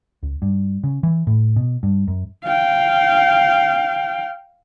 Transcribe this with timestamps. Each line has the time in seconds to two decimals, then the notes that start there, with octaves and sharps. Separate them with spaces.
0.23 C#2
0.42 G2
0.84 C#3
1.03 E3
1.27 A2
1.56 B2
1.83 G2
2.08 F#2
2.45 F5 G5